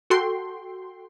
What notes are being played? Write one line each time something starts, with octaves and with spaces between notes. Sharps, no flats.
F#4 A4 G5 C6